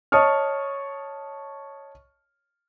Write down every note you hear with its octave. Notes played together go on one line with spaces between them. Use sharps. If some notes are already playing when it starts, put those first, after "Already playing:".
C#5 D#5 A5 C#6 D#6 F6